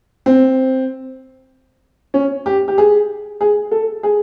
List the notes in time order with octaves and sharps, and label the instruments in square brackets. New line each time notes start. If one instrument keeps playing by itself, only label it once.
[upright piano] C4
C#4
G4
G4
G#4
G#4
A4
G#4